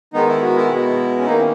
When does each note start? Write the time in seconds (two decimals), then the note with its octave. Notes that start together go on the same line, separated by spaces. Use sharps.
0.14 D#3 G#3 B3 D#4
0.27 E4
0.42 F#4
0.56 E4
0.69 B2 G#3 B3
1.18 C#4
1.25 D#3 A#3 D#4
1.39 C#4